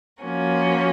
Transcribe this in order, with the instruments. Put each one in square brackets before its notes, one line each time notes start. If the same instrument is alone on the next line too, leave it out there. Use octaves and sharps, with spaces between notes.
[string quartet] F3 A#3 C#4 F#4